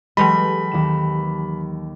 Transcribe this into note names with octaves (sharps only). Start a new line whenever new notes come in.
E3 F#3 G#3 G4 A4 D#5 B5
D#2 D#3 E7